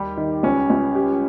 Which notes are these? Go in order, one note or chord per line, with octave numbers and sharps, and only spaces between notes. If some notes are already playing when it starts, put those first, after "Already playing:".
Already playing: D#2 G3 G4
D#3
C#2 C#4
C#2
G4